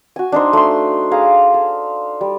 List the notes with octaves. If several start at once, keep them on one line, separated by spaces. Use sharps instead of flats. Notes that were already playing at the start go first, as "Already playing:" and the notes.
F#4 G#5
D4 D#4 C5
A3 C6
G#4 F5 A#5
A4
G3